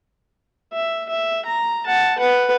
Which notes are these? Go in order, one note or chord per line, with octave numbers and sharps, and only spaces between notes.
E5
E5
A#5
F#5 A5
B4 F#5